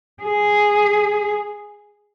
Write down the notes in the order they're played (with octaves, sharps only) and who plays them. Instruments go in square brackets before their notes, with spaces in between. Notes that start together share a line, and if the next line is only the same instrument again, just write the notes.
[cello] G#4